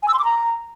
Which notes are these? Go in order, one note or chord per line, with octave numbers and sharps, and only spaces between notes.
G#5
E6
C6
D6
A#5